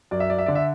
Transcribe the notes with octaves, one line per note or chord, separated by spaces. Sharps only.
F#2 D5
E5
D5
E5
D3 D5
E5